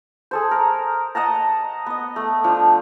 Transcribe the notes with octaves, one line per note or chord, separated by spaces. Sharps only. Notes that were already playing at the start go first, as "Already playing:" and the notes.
G#4 A4 C5
A#4
D#5 F#5 A5 A#5
B3 D#5
A3
F3 D4